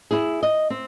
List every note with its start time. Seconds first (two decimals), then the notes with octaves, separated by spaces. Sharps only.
0.11 E4 G#4
0.43 D#5
0.70 C4